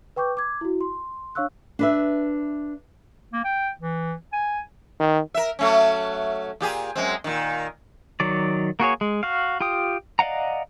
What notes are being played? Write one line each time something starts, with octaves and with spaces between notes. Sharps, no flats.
B4 G5 C#6 D6 G6
D6 G#6
E4 F#4
C6
D4 C#5 F5 C#6 E6 F#6
D4 B4 E5
A#3
G5
E3
G#5
D#3
A#4 E5
F#3 A3 C#4
A#2 G4 G#4
F#2 G#3 C4
A#2 D#3
D#3 F#3 D5
A#3 F#4 G#4 C#5
G#3
F#4 F5
F4 G4 G5 D#6
D5 D#5 F5 F#5 A#5